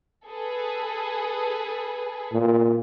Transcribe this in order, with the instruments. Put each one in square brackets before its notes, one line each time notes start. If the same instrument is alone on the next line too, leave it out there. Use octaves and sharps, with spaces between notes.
[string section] G#4 A4 B4
[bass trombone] A#2